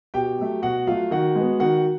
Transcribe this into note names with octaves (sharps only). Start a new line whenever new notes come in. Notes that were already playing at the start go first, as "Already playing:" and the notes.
B2 G4 G5
F#3 A3
B2 F#4 F#5
F#3 A3 F4 F5
D#3 F#4 F#5
G#3
B3
D#3 F#4 F#5